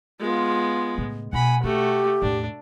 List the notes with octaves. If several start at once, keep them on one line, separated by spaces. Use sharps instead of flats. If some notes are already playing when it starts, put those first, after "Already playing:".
G#3 B3 F4
A2 C#3
B2 B3 F#5 G#5 B5
A3 C#4 F#4 G4
E2 A2 D4